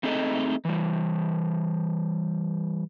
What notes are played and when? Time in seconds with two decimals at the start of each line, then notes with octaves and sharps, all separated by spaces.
0.03 A3 C4 D#4 G#4 A4 D#5
0.65 E3 G3